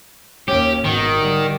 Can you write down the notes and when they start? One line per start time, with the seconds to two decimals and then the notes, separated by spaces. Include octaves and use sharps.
0.48 D#2 C#4 G4
0.84 G#1 B2 D#3
1.16 D3 G3